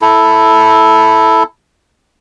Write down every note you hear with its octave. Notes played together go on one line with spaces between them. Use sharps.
E4 A4